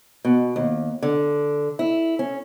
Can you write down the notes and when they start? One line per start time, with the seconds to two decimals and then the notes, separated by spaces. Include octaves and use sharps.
0.25 B2
0.56 D#2
1.02 D3
1.79 E4
2.19 C#4